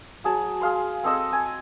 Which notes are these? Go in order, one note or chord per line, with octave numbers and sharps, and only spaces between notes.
F#3 G#4 A5
G#4 F5 C6
C4 A4 D#5 E6
G#5